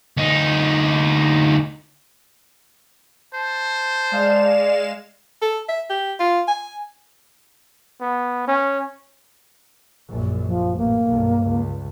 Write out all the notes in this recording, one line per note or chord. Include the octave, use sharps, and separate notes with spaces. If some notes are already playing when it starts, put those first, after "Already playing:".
D2 D#4
C5 A5
G#3 D5 F5 E7
A4
E5
G4
F4
G#5
B3
C#4
A#1 F#2
F3
A1 A#3
B1 G2
C#2